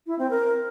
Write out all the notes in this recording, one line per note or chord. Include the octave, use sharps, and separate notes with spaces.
E4
C4
A#4